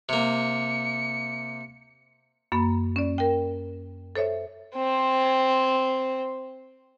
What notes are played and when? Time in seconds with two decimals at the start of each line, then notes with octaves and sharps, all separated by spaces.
0.09 C3 A#3 C#7
2.52 F#2 A#3 B5
2.96 C#4 D5
3.18 A#4 G5
4.16 A4 C5 C#5 E5
4.76 C4 C5